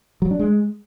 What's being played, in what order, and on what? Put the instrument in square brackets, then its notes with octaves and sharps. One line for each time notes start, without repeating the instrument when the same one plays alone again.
[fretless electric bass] F#3
D4
G#3